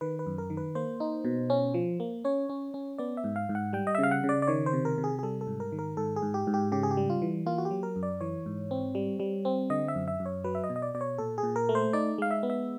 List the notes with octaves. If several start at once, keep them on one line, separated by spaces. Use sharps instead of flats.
D#3 B4
B4
F#2
A#4
D#3
B4
A#3 C5
D#4
B2
C#4
F3
A#3
C#4 C#5
C#4
C#4
B3 D5
E5
G#2
F5
G#2
F#5
G3 G5
D#5
E5
C#3 F5
F#5
C#3
D5
D5
D#3 C#5
C5
C3
A#4
C3
G#4
G#4
G3 A4
A4
G#2
A#4
D#3
A#4
G#2 A4
G#4
G#2
G4
G#2
G4
C#3 G4
G#4
G4
G3
F4
E3
A#3 F4
F#4
G4
F#3
A#4
F#2
D5
E3 C#5
G#2
C4
G3
G3
C4
D3 D#5
E5
F#2
E5
F#2
C#5
F#3 B4
E5
D#5
B2
D#5
D5
B2 D5
C#5
A#2 A4
G#4
A#2
A#4
A3
C5
D#4 D5
G#3 F5
E5
B3
E5